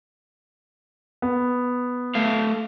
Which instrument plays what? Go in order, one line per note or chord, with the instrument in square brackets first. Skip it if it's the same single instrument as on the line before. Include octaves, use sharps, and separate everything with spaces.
[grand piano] B3
[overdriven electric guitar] A3 F5